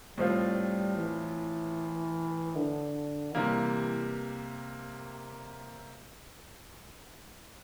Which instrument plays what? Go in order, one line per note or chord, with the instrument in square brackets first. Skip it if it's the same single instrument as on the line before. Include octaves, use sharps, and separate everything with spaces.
[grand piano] A2 F3 C4 F4 [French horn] G3
[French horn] E3
D3
[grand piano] C3 G3 A#3 [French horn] E3